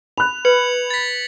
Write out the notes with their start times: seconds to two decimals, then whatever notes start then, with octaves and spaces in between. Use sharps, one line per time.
0.18 B5 F#6 F7
0.45 B4 G#6 C#7 F#7
0.90 A6 B6